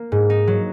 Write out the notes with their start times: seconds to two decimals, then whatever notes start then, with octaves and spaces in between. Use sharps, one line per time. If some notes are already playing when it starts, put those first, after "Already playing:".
Already playing: A#3
0.12 G#2
0.30 D#4
0.47 F#3